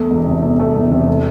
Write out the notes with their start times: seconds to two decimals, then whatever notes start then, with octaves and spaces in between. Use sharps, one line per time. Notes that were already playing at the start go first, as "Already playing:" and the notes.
Already playing: E2 A3
0.11 E1
0.27 C3
0.43 E2
0.59 A3
0.75 E1
0.91 C3
1.08 A3